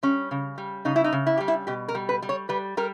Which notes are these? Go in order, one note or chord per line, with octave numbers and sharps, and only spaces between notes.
G3 C#4
C#3
G3
C#3 D#4
E4
D#4
C#3
E4
G3 G4
E4
B2 G4
A#4
G3
B4
G3
C#5
G3 B4
G3 A#4